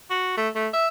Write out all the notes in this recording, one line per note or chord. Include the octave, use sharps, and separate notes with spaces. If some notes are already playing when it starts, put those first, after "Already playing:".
F#4
A3
A3
E5